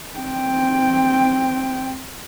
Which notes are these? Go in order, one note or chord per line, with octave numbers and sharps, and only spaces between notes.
C4 G5